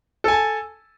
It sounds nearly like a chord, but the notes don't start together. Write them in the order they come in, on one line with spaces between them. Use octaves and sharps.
A4 G#5 A5